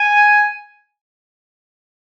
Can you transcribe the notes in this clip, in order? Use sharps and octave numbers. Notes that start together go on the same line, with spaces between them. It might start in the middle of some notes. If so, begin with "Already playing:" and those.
Already playing: G#5